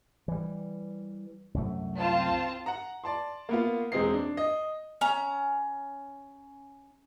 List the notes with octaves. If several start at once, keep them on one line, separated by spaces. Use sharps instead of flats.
E3 G3
C2 F#2 A3
C4 F4 A5
F#5 A#5
D5 A5 C6
A#3 B3 F4
E1 G#3 C4 D#5 C7
D4
D#5
C#4 A#5